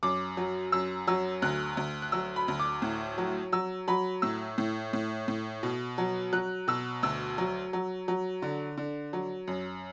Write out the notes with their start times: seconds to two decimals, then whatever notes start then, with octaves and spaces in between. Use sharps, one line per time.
0.03 F#2 D6
0.37 F#3
0.72 F#2 E6
1.07 F#3 E6
1.42 D2 F#6
1.77 D2
2.02 F#6
2.12 F#3 E6
2.36 B5
2.48 D2
2.60 D6
2.82 A2
3.18 F#3
3.52 F#3 E6
3.88 F#3 B5
4.22 A2 E6
4.58 A2
4.93 A2
5.28 A2
5.63 B2
5.98 F#3
6.33 F#3 F#6
6.68 B2 E6
7.03 D2 E6
7.38 F#3
7.73 F#3
8.08 F#3
8.42 D3
8.77 D3
9.13 F#3
9.48 F#2